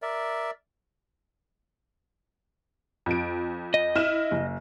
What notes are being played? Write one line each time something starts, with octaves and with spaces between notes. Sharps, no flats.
A#4 D5 E5
F2 D7
D#5
E4 F6 E7
F#1